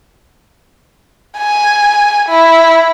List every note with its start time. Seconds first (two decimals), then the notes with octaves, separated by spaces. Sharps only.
1.38 G#5
2.29 E4